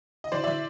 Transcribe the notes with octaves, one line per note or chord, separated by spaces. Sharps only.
D#5
E3 C5 D5
E3 D5 E5